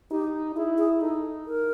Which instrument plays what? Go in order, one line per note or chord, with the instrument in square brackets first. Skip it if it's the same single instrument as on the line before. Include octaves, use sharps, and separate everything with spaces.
[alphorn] D#4 [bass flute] G4
[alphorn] E4 [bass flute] G#4
[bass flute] G#4
[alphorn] D#4 [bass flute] A4
[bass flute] A#4